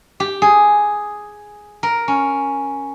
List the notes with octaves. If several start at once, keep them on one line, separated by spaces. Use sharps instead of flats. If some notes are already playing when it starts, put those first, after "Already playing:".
G4
G#4
A#4
C#4